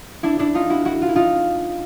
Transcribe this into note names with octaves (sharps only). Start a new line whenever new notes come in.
D4 E4
D4 E4
D#4 F4
E4 F#4
E4 F#4
F4
E4
D#4 F4